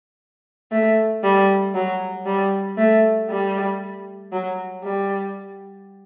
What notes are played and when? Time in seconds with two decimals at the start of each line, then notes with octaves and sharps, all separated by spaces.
0.72 A3
1.24 G3
1.75 F#3
2.26 G3
2.78 A3
3.29 G3
4.32 F#3
4.84 G3